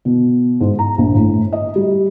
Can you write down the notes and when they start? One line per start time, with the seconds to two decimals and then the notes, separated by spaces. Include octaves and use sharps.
0.05 B2
0.60 G#2
0.79 A#5
0.98 A#1
1.15 A2
1.53 D#5
1.75 G3